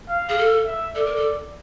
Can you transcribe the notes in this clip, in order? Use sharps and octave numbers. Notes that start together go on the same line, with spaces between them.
F5
G#4
A4
E5
A4 D5
A#4
A4